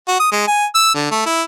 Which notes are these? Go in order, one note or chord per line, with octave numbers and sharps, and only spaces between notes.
F#4
D#6
G#3
G#5
E6
D3
A3
E4